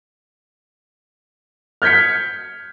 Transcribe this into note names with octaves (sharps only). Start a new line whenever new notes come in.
F6 G6 G#6 B6 C#7